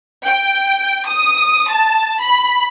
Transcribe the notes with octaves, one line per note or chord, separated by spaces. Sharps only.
G5
D#6
A5
B5